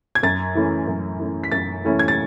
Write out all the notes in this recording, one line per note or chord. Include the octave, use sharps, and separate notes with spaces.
G#6
F#2 A6
E3 A3 C#4 E4
F#2
E3 A3 C#4 E4
B6
F#2 A6
E3 A3 C#4 E4
G#6
A6